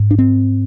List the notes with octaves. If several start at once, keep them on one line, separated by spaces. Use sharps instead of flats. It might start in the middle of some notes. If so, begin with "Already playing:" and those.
Already playing: G#2
D4
C4